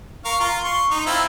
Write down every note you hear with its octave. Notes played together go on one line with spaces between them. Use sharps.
A#4 F5 C#6
F4
C6 C#6
D#4
C4 E4 F4